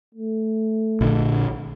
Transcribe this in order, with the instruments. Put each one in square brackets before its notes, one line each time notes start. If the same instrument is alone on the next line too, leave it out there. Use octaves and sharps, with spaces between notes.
[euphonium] A3
[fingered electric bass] A#1 D3